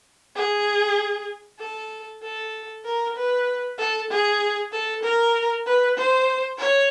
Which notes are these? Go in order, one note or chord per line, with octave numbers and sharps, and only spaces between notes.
G#4
A4
A4
A#4
B4
A4
G#4
A4
A#4
B4
C5
C#5